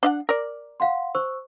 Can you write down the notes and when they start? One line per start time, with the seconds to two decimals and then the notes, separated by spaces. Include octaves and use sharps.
0.03 D4 F5 F#5
0.29 A#4 D5
0.80 F5 F#5 C6
1.15 C5 C#6 E6